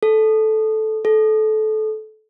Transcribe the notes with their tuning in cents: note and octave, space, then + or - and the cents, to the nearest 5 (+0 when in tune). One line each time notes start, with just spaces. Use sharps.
A4 -10
A4 -20